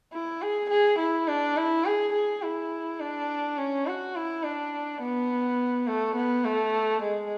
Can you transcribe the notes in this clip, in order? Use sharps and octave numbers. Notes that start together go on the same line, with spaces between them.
E4
G#4
G#4
E4
D4
E4
G#4
G#4
E4
D4
C#4
F#4
E4
D4
B3
A3
B3
A3
G#3